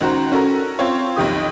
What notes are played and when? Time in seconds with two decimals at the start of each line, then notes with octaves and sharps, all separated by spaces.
0.01 C#2 D#3 F#4 C5 A#5
0.32 C#4 F#4 A4 A#4
0.79 C4 F4 C5 C#5
1.16 B1 F2 D#3 G4 D#6